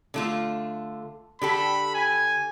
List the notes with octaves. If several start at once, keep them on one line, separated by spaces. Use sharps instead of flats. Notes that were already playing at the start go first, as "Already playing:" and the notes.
D3 A3 F4
D3 G4 A4 B5
G#5